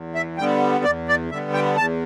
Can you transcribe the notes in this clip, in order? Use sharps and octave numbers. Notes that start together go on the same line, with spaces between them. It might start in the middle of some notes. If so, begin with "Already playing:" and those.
Already playing: E2
E5
D3 G3 B3 G5
E2 D5
D5
D3 G3 B3 E5
G5
E2 A5